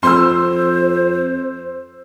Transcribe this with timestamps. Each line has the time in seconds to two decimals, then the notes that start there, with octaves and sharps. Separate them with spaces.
0.03 F2 C5 C6 E6